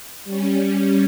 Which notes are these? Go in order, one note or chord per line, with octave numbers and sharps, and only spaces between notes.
G3 C#4